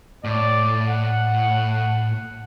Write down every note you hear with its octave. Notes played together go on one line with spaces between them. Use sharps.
A2 D5
F#5